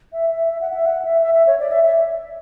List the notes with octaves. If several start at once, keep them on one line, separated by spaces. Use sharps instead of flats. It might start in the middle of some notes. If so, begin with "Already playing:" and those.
E5
E5
E5
F#5
E5
F#5
E5
E5
E5
C#5
D5
E5
E5